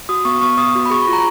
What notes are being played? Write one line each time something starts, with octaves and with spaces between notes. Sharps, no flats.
F#4 D#6
B3 C#6
B3 C#6
B3 D#6
F#4
B5
G#4 C#6
B5
F4
A#5